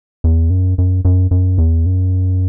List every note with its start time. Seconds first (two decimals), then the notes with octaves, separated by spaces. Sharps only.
0.24 E2
0.50 F#2
0.78 F#2
1.05 F#2
1.31 F#2
1.58 E2
1.86 F#2